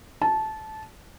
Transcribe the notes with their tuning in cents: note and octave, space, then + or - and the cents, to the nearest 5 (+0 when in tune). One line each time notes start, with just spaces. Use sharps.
A5 -15